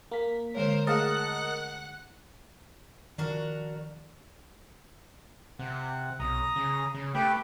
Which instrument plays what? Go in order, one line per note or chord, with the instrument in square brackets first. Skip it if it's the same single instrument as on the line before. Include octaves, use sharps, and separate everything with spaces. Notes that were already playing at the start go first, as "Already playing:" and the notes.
[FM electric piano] A#3 B6
[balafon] D3 G#3 C#5 [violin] A#4 C5
[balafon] A3 G#4 F5 [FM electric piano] A#4 D#5 A5 [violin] F#5 F#6
[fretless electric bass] D#3 F3 [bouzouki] D4 F#4 A#4
[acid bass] C3 [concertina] F#5
[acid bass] B1 [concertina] A#5 D#6
[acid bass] C#3
C#3
[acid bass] A3 [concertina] G4 B4 G5